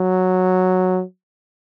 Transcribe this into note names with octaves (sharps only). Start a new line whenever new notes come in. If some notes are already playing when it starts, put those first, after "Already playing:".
Already playing: F#3